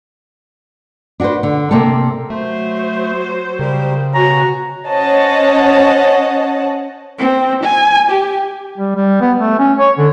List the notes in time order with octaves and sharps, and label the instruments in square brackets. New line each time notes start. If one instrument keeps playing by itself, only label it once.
[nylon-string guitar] D4 F#4 G#4 B4 C5
D3
C3 A#3 C4 G4 A4
[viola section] F#3 C5 [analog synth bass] A3
[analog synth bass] C#3 [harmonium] G3 G4 A#4
[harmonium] B2 C#5 G#5 [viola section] F#4 [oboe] A#5
[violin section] C#4 C5 C#5 D#5 F#5 A5
[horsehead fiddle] C4
G#5
G4
[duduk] G3
G3
B3
A3
C#4
C#5
D3